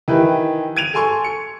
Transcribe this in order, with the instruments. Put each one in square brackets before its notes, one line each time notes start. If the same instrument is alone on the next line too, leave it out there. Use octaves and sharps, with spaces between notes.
[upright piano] D#3 E3 E4 G4 B4
G#6 D#7 F7
A4 G#5 C6 C#6
C#7